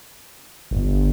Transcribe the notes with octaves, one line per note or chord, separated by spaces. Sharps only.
G1